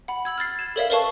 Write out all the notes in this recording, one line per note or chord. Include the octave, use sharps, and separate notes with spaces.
F#5 B5
B5 E6 G#6
F6 G#6 A6 C7
G#6 E7
A4 A#4 C#5 D5 E5 F5
A#4 B4 C#5 F5 A5 C#6